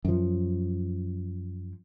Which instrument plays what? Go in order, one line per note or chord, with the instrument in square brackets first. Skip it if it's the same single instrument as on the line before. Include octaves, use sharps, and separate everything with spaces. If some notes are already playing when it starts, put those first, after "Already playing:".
[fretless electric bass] F#2 F3